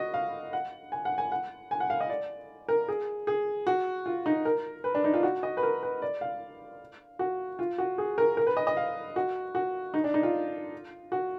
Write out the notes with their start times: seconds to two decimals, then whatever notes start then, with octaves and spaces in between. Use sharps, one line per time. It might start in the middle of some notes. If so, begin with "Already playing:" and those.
Already playing: F#4 D#5
0.14 F5
0.53 F#5
0.92 G#5
1.05 F#5
1.18 G#5
1.32 F#5
1.71 G#5
1.80 F#5
1.90 F5
2.00 D#5
2.09 D5
2.69 A#4
2.88 G#4
3.27 G#4
3.67 F#4
4.06 F4
4.26 D#4
4.45 A#4
4.84 B4
4.95 D4
5.04 D#4
5.14 F4
5.23 F#4
5.43 D#5
5.57 B4
5.63 A#4
5.83 B4
6.02 D5
6.21 F5
7.19 F#4
7.59 F4
7.78 F#4
7.98 G#4
8.18 A#4
8.37 A#4
8.47 B4
8.57 D#5
8.67 D#5
8.77 F5
9.16 F#4
9.55 F#4
9.94 D#4
10.04 D4
10.14 D#4
10.23 F4
11.12 F#4